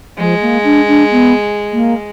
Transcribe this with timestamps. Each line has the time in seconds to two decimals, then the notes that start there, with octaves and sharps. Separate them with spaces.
0.18 F3 G#3
0.41 A#3
0.64 D4
0.87 D4
1.11 B3
1.72 A#3